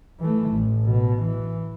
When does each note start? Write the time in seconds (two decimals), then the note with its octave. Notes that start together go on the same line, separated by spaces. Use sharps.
0.20 E3 A3
0.51 A1
0.85 B2
1.23 E3